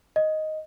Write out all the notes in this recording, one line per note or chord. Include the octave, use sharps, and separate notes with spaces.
D#5